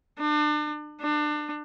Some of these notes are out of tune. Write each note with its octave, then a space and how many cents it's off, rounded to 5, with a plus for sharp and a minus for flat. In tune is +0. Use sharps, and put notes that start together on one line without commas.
D4 +35
D4 +30